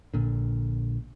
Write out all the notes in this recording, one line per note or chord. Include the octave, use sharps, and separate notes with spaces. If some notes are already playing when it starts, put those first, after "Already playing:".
A#1 A#2 D3